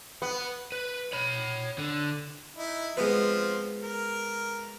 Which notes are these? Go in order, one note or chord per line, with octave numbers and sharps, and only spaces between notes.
B3
B4
C#5 B5
D3
D#4 E4
F3 G#3 B3 C4 B4
A#4